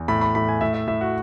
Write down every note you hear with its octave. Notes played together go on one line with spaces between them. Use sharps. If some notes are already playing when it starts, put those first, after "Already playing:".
Already playing: E2
A2 B5
B5
A2 B5
G#5
A2 E5
E5
A2 E5
F#4